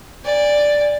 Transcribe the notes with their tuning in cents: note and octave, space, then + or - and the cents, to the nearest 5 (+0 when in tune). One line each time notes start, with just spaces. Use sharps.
D5 +0 G#5 -30